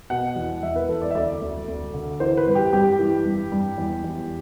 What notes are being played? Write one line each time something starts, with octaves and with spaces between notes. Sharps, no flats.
B2 F#5
E2
E2 E5
B4
E2 A4
D5
E5
D2 D5
D2
D2
D3
E3 C5
B4
G2
G4
G2 G4
E3
G2
G2
E2
E2